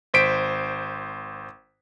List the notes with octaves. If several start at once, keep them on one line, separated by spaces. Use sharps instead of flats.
G#1 C5 B6 D7